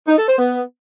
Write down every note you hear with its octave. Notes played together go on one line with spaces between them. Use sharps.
D#4
A4
C5
B3